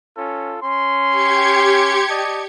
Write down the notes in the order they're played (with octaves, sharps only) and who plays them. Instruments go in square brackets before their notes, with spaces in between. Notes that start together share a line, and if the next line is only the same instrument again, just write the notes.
[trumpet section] C#4 F4 A4
C#4 C6
[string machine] G4 G#6 C#7
[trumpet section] D5 D#5 A5